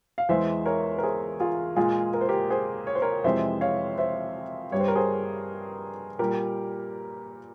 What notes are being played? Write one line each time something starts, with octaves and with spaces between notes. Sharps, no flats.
F5
E2 E3 G#3 C5 E5
A#4 C#5
A#4
G#4 C5
F4 G#4
A#2 G#3 F4 G#4
A#4
C5
G4 A#4
G#4 C5
C#5
C5
A#4 C#5
F2 C3 E3 G#3 C5 E5
C#5 F5
C5 E5
G2 G3 C#5
C5
A#4
G#4 C5
A#2 G3 G4 A#4